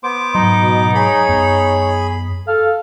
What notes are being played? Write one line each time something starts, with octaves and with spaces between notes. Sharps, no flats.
B3 C5 D6
G#2 F#3 D#4
B2
G#4 C#5 B5
F#2 B3
A4 F5